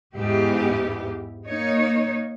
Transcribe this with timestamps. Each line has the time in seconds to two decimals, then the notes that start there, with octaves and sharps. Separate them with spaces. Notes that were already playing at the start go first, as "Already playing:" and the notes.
0.15 E2 G#2 E3 G4
1.48 A#3 D#4 C#5